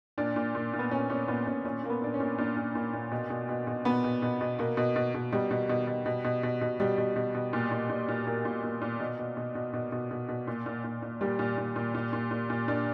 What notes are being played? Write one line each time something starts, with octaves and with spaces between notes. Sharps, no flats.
A#2 D4
A#2
A#2
A#2
B3
A#2 C#4
A#2 C#4
A#2 B3
A#2 C#4
A#2 C#4
A#2 A#3
B3
A#2 D4
C#4
A#2
A#2 D4
A#2
A#2
A#2
B2
B2
B2
B2
B2 B3
B2
B2
B2
B2 A#3
B2
B2
B2
B2 G3
B2
B2
B2
B2
B2
B2
B2
B2 G3
B2
B2
B2
A#2
A#2
A#2
A#2
A#2 A#3
A#2
A#2
A#2
B2
B2
B2
B2
B2
B2
B2
B2
A#2
A#2
A#2
A#2
A#2 G3
A#2
A#2
A#2
A#2
A#2
A#2
A#2
A#2 D4